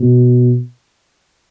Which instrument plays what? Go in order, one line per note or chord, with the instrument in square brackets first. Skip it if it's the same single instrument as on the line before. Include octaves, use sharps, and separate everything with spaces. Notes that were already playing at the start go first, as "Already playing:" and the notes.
Already playing: [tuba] B2